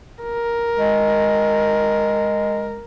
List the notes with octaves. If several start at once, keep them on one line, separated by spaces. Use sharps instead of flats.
A#4
G#3